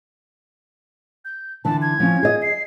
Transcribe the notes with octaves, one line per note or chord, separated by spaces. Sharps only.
G6
D3 E3 A5
G#6
F3 C#4
G#4 D#5
C7